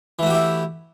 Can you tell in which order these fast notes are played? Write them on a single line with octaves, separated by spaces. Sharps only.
E3 A3 F#4 G4 E4